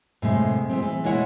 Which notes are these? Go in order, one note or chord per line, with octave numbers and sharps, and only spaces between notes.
A2 C3 G#3
E3 G#3 C4
E3
B2 G#3 E4 C#5 F#5